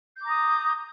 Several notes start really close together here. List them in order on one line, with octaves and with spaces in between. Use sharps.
G6 D6 A#5 D#6